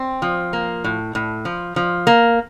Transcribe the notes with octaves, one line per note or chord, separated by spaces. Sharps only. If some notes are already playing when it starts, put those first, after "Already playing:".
Already playing: C4
F3
A#3
A2
A2
F3
F3
A#3